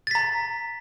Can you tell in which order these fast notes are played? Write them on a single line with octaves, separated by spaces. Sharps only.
A6 B6 A#5